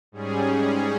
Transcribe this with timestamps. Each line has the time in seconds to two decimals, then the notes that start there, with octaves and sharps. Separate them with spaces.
0.12 G#2 G3 C#4 G#4